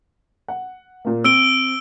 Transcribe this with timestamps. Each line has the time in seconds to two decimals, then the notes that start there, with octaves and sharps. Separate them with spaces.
0.48 F#5
1.05 A#2 A#3
1.24 C4 E6 D7 G7